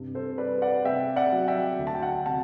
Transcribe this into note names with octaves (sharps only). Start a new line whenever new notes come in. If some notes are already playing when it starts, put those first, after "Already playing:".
Already playing: G2 C3
A4 C5
G3 B4 D5
D5 F#5
C3 E5 G5
D5 F#5
F#3
E5 G5
D2
A5
G5
F#5 A5
C3 F#5 A5